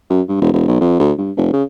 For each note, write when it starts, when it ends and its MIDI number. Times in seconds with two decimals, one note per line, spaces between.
0.10 0.21 42
0.29 0.37 43
0.41 0.51 28
0.53 0.63 28
0.68 0.80 35
0.81 0.95 41
1.00 1.12 38
1.18 1.31 43
1.37 1.52 29
1.53 1.63 49